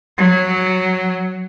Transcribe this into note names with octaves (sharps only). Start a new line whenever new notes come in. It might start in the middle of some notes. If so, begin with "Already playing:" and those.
F#3